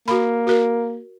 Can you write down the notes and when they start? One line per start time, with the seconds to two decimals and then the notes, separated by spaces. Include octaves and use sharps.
0.08 A#3 F#4 B5
0.47 F#4 A#4